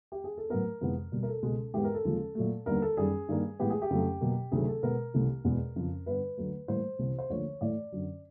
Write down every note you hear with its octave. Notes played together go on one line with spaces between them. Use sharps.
G4
G#4
A4
A2 F#3 B3 A#4
F2 C3 E3 G#3 B3
B2 G3 A#3
A#4
A4
C#2 B2 G#3 B3
G#2 E3 G#3 B3 G4
A#4
A4
D#2 C#3 F3 G#3
A#2 F#3 A3
D#2 D3 G3 B3 A#4
A4
F#2 D#3 G3 G#4
G2 D#3 G3 A#3
A2 E3 G#3 B3 G4
G#4
G4
F2 C#3 F#3 A3
B2 F#3 A#3
D2 C3 D#3 F#3 A3 G#4
A4
B2 G#3 B3 A#4
C2 C3 E3 A3
E2 B2 G#3 B3
F2 C#3 F3
G2 D3 G3 B3 B4
D2 D3 F#3 A3
A2 E3 G3 A#3 C5
C2 C3 E3
C5
D2 D3 F3 A#3 C#5
A2 E3 A3 D5
F#2 D3 F#3